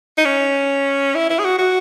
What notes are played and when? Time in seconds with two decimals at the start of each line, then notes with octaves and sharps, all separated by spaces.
0.17 D#4
0.25 C#4
1.15 E4
1.30 E4
1.39 G#4
1.44 F#4
1.58 F#4